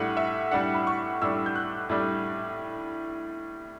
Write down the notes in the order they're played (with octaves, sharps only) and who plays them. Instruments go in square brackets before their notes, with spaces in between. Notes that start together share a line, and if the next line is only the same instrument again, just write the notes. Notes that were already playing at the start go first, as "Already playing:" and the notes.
Already playing: [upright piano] A2 G3 D4 F#5
E5
A2 G3 D4 F#5
B5
C#6
A2 G3 D4 E6
G6
F#6
A2 G3 D4